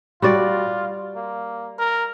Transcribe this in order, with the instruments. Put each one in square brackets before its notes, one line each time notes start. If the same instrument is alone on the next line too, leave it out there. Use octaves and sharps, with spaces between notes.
[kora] G3 F#4 D5 [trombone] F4
[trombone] A#3
A#4